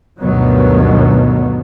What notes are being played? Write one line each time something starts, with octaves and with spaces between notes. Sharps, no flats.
D2 G2 B2 D#3 F#3 B3